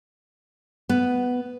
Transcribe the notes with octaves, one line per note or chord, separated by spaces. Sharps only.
B3